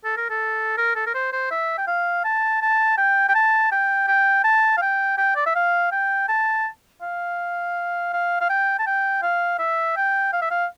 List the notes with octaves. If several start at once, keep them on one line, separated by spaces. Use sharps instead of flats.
A4
A#4
A4
A#4
A4
A#4
C5
C5
E5
G5
F5
A5
A5
G5
G5
A5
G5
G5
A5
F5
G5
G5
D5
E5
F5
G5
A5
F5
F5
F5
G5
A5
G5
F5
E5
G5
F5
E5
F5